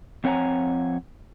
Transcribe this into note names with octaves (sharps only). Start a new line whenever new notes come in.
F2 C4 C#5 F#5 G#5 A#5